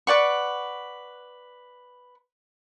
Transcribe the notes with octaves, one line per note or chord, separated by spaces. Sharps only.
B4 D5 F#5 C#6